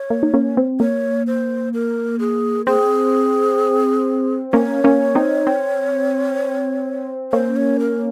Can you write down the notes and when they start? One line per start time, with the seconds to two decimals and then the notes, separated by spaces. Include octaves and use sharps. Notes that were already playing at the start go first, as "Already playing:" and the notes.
Already playing: C#5
0.10 A#3
0.23 D#4
0.34 A#3 C#4
0.57 C4
0.80 A#3 C#5
1.27 C5
1.74 A#4
2.20 G#4
2.67 C4 G#4
4.53 A#3 C#4 C#5
4.84 A#3 C#4
5.15 C4 D#4
5.47 C4
7.33 A#3 C#4 C5
7.56 C#5
7.80 A#4